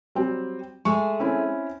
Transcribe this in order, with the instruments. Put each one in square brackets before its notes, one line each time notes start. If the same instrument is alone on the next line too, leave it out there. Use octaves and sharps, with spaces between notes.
[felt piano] F#3 G3 C4
[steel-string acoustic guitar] G#3 A3 G#4 [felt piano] C#6
[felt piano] C4 C#4 E4